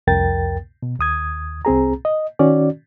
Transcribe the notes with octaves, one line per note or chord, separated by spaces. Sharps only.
C2 F2 A#4 G5 A6
B2
D#2 D#6 G#6
C2 C4 G#4 A#5
D#5
D#3 C#4 F#4 D5